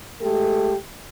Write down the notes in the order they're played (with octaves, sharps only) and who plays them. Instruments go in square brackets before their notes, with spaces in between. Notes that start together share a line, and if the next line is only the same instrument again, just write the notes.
[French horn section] G#3 A3 G4 A4